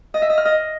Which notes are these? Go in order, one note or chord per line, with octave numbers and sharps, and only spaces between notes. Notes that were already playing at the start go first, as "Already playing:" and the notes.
D#5
E5
D#5
F6
D#5